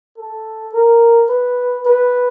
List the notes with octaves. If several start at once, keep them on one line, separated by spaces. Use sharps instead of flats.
A4
A#4
B4
B4